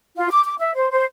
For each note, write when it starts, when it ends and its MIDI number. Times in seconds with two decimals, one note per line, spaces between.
0.17 0.28 65
0.31 0.42 86
0.44 0.54 86
0.60 0.71 76
0.75 0.89 72
0.91 1.04 72